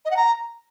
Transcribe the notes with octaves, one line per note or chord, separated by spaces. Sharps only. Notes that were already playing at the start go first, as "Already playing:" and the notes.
D#5
F#5
A#5